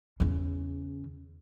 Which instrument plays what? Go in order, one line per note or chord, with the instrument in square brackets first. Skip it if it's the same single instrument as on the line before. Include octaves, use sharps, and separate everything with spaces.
[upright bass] E2 C#3